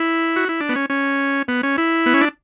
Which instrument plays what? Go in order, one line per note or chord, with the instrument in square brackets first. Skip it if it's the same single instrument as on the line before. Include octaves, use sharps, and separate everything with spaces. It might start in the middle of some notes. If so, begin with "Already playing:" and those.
Already playing: [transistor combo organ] E4
F#4
E4
D4
B3
C#4
C#4
B3
C#4
E4
B3
C#4
D4